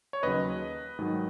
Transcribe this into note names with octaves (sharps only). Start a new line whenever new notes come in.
C#5
D#2 C#3 F#3 B4 D#5
G#2 D#3 F#3